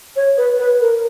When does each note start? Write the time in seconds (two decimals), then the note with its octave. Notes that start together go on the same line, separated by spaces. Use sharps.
0.15 C#5
0.37 B4
0.58 B4
0.80 A#4